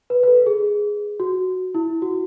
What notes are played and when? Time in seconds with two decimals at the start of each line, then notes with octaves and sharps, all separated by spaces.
0.10 B4
0.23 B4
0.28 A4
0.46 G#4
1.20 F#4
1.75 E4
2.02 F#4